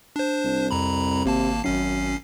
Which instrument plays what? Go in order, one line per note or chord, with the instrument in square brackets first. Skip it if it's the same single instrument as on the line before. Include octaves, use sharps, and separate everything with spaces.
[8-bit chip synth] D4 C5
[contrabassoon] C2
[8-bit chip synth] F2 A#5 B5
[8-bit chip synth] G#1 A#3 A5 [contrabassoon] C3
[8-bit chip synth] G#1 C#4 C7 [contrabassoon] F#2